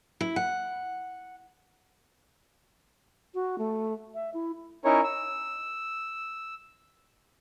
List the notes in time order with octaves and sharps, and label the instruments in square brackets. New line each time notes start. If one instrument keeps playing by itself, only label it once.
[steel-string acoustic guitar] E4
F#5
[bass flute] F#4
A3
E5
E4
[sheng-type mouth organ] C#4 D#4 E4 A#4 C#5
E6